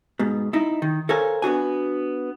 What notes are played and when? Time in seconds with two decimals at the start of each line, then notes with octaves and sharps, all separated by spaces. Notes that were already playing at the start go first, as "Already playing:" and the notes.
0.19 G#2 B2
0.53 D#4 E4
0.82 D#3
1.09 A4 A#4 C5 C#5 F5 G#5
1.42 B3 D4 F#4 G#5